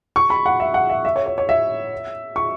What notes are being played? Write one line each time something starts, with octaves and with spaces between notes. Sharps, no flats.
C#6
B5
F#5
E5
F#5
E5
E5
C#5
C#5
C#5
E5
C#6